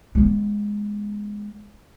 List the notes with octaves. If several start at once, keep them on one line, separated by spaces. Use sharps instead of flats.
G#3 B3